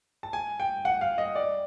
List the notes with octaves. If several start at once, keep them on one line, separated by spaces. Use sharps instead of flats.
A5
G#5
G5
F#5
F5
D#5
D5